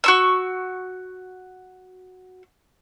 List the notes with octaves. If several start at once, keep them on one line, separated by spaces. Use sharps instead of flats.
F#4 C#6 E6